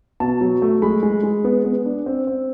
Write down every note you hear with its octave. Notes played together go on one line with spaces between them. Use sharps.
B2 A5
F#3
A3
G#3 B5
G#3
G#3
B3
B3
D4
C4
C4